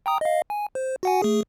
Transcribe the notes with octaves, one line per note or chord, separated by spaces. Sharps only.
G5 A#5 D#6
D#5 F5
G#5
C5
F#4 F#5 G#5
A3 G#4